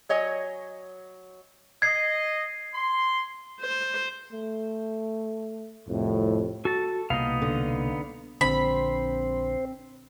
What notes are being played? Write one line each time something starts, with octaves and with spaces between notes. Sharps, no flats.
F#3 C#5 D#5 G#5
D#5 G#6 C7
C6
C5
A3
C2 F2 A2
F#4 A4 A5
C2 B2 A#3 B3 D#4 D#5 F5
D3
A#1 D3 C4 C5 B5